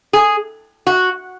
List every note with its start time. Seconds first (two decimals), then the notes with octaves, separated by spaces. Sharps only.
0.13 G#4
0.87 F#4